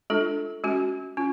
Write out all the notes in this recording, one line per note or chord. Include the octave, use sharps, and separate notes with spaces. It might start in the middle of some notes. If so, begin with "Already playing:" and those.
G#3 D4 F4 A4
G#3 C#4 F#4
C#4 F4